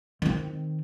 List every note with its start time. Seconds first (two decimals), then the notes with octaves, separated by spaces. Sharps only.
0.22 D#3 C4